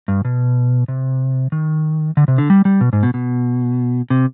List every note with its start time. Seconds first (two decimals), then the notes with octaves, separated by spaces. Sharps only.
0.08 G2
0.25 B2
0.88 C3
1.52 D#3
2.17 D3
2.28 C3
2.38 D3
2.50 G3
2.65 G3
2.81 B2
2.93 G#2
3.03 B2
3.14 B2
4.10 C3